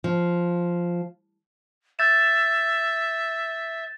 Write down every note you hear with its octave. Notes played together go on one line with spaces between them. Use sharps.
F3
E5 G6 A6 E7